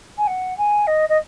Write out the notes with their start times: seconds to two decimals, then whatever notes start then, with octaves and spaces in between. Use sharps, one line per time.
0.18 G#5
0.27 F#5
0.58 G#5
0.87 D#5
1.09 D#5